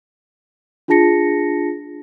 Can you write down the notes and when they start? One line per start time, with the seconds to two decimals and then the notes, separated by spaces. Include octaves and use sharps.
0.88 D4 F4 G#4 A5 A#6 C#7